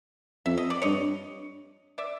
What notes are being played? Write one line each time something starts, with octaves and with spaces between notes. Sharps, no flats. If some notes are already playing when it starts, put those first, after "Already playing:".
F2 E5
D#5
D5
G2 C#5 D#5
D5 E5